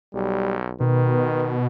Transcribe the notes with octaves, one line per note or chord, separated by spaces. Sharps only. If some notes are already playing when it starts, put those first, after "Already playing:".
B1 G3
B2 D#3 B4